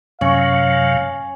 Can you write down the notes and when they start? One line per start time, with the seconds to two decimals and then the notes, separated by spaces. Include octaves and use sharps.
0.21 F#2 C3 F#3 C#4 F5